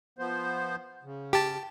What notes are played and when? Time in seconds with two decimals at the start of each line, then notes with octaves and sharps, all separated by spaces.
0.19 F3 B3 C5
1.03 C#3
1.33 G4 A5